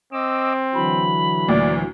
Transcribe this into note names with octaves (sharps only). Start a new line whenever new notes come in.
C4 D#5 D6 E6
D3 E3 F#3 B5
D2 A#2 D5